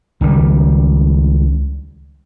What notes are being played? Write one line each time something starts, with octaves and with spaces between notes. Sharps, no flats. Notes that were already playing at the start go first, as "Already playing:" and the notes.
C#2 D#3 G3